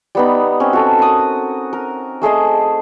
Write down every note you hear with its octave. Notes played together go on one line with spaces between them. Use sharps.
G3 B3 D#4
C4 C#4
F#4 A4
A#4 D#6
A#4
A3 G#4 C5 D#5